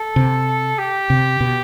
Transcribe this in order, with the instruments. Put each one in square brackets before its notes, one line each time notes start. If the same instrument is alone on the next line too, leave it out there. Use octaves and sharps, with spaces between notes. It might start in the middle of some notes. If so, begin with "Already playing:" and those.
Already playing: [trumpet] A4
[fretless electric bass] C3
[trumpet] G4
[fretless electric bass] C3
B2